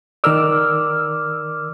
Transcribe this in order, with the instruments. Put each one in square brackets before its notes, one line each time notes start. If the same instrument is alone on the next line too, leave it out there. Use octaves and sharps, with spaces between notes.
[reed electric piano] D#3 A#4 D5 [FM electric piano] D6 E6 F6